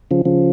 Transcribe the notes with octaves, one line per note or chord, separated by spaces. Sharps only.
C#3 F3
C#3 F3